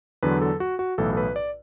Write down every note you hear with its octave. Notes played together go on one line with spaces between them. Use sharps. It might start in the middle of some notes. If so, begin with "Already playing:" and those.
E2 D3 F#3 B4
A4
F#4
F#4
B1 A2 E3 A4
A4
B4
D5